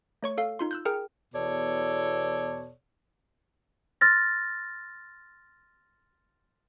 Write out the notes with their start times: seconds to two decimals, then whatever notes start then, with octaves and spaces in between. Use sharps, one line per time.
0.23 A3 C#5 C#6
0.38 A4 F5
0.59 D#4 F4 C6
0.71 E6 F#6 G6
0.85 G#4 A#4 G5 F6
1.34 E2 B2 A4 C#5 D5
4.01 C6 F6 A6 A#6